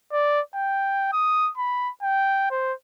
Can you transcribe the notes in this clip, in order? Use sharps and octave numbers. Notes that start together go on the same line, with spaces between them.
D5
G5
D#6
B5
G5
C5